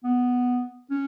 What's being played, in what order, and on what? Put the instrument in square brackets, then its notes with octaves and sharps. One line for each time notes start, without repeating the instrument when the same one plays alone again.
[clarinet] B3
C#4